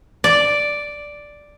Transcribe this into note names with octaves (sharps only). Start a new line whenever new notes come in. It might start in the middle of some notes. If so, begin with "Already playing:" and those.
D5